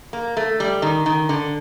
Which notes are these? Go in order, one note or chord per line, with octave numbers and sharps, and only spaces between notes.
A#3
A3
G3
D#3
D#3
D3